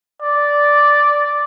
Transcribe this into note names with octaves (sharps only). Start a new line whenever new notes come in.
D5